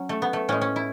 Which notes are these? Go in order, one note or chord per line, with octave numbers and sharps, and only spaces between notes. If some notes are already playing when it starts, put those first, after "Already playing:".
Already playing: F#3 C#4
A3
B3
A3
A2 G#3 C#4
C#4
E4